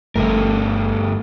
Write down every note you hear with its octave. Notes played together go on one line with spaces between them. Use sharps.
G1 G2 D3 A3 A#4